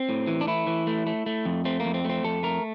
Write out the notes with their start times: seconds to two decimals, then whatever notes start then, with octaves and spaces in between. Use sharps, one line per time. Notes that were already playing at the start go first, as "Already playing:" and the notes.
Already playing: C4
0.09 A2
0.28 E3
0.41 D4
0.47 A3 E4
0.67 E3
0.87 A3
1.07 A3
1.26 A3
1.45 F2
1.65 A3 C4
1.80 A#3
1.85 F2
1.94 C4
2.05 A3 C4
2.24 F2 A4
2.43 A3 A#4